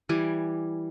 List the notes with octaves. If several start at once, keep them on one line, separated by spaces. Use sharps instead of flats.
E3 G3 G#5 D6